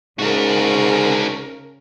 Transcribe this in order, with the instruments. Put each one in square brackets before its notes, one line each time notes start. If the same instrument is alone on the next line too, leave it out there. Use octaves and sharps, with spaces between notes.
[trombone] G#2 [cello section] C#3 A#4 [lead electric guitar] D4 F#4